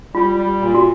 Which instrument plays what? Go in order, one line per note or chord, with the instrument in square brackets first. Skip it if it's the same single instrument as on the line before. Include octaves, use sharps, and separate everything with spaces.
[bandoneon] G3 [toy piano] F4
[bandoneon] G3
A#2
[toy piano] F#4